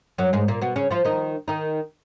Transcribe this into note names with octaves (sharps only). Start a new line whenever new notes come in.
F#2 F#3
G#2 G#3
A#2 A#3
B2 B3
C#3 C#4
F3 F4
D#3 D#4
D#3 D#4